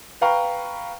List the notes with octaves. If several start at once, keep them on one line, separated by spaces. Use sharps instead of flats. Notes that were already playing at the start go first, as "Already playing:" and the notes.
B4 F5 G5 A#5 C#6